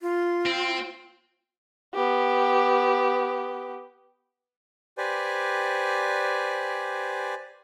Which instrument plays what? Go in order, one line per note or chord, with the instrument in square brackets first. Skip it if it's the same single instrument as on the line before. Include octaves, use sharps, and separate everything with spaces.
[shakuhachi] F4
[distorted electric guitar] C4
[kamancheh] B3 G4
[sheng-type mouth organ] G4 B4 C5 D5 G#5